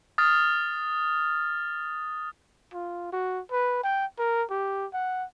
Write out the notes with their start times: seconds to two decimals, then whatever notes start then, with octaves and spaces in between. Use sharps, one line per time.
0.18 D#6 F6 A6
2.73 F4
3.13 F#4
3.51 B4
3.84 G5
4.19 A#4
4.51 G4
4.94 F#5